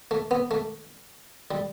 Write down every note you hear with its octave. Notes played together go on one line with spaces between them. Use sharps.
A3
B3
A3
G3